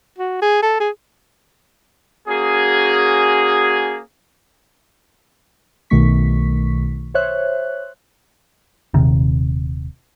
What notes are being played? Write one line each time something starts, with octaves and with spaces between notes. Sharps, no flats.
F#4
G#4
A4
G#4
A#3 C#4 F#4 G#4
B1 B2 D#3 A3 C#6 B6
C5 C#5 E5 F#6
D#1 C3 D#3